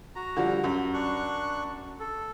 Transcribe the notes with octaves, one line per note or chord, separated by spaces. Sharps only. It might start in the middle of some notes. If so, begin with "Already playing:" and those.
F#4 A#5
D3 F3 G3
F#2
D4 C#6 F#6
A4